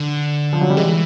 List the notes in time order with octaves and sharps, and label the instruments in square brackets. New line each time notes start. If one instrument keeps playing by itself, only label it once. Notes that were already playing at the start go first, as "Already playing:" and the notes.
Already playing: [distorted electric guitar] D3
[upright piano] F3
F#3
G3
[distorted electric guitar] E3 [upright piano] G#3